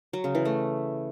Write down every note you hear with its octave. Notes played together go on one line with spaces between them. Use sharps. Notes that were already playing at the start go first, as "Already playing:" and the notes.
F#3
C#3
E3
A3